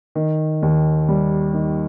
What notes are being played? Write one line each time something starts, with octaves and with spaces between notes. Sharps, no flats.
D#3
D#2
G3
D#3